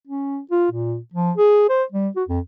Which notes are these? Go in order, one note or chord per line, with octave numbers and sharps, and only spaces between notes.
C#4
F4
A#2
F3
G#4
C5
G3
F#4
F2